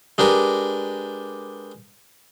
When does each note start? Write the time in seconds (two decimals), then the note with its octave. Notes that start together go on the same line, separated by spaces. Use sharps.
0.18 G#3 D4 G4 A#4 B4